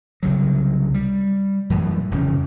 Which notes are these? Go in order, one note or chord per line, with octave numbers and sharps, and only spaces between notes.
C2 C#3 F#3
G3
F#2 A2 E3 G3
E1 F2 C#3 C#4